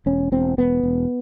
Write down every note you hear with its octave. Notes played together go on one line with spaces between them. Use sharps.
E1 C#4
E1 C4
E1 B3
E1